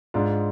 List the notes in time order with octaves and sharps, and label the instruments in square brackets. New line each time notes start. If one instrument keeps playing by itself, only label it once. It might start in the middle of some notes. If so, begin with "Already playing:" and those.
[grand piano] G#2 G#3 D4 F4